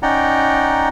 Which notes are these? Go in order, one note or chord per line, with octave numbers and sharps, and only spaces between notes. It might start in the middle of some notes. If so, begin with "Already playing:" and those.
C#4 D#4 D5 F#5 G5 A#5